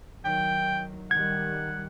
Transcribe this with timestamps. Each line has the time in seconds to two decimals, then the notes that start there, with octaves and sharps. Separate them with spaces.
0.25 D#3 F#3 G5
1.11 D#3 G3 F#5 G#6